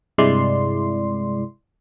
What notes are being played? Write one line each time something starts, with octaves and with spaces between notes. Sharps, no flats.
G2 C3 G#3 E4 D5 C6